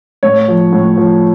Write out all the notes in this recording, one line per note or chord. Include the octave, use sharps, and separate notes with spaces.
A2 C#5
F3
A2
F3